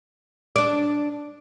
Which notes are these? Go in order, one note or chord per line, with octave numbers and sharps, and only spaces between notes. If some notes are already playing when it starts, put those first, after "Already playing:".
D4 D5